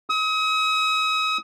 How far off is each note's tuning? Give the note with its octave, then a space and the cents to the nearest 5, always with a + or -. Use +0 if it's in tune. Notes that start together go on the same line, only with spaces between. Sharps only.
D#6 +40